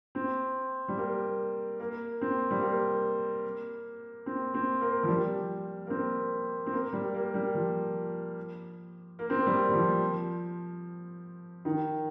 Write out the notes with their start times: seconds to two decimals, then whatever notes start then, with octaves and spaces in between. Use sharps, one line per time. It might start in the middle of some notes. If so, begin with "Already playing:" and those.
0.15 C4
0.88 G3
0.98 A#3
1.80 A#3
2.21 C4
2.51 G3
2.61 A#3
4.26 C4
4.54 C4
4.81 A#3
5.03 F3
5.08 G3
5.87 A#3
5.90 C4
6.66 C4
6.72 A#3
6.93 G3
7.14 A#3
7.34 G3
7.55 F3
9.19 A#3
9.30 C4
9.37 A#3
9.46 G3
9.69 G3
9.74 F3
11.65 D#3